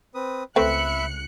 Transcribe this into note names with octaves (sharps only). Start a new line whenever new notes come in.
C4 B4 D#6
C#2 A3 C4 B4 E5 B5 F#6 C#7